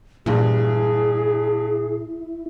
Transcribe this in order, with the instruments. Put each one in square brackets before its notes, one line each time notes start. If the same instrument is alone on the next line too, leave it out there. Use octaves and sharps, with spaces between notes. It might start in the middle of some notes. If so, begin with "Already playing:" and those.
[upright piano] G2 E3 [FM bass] A#2 [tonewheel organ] E4 [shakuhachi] G#4